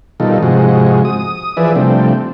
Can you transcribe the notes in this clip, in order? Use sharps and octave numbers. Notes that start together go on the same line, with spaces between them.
B2 D#3 G3 D#4 F4 A4
G#2 C3 F3 G#3 F#4
D#6
E3 F3 G#4 B4 D5 E5
C3 F3 G3 A3 C4 D4